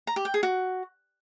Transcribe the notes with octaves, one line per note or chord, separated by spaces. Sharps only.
A#5
G4
G5
G#4
F#4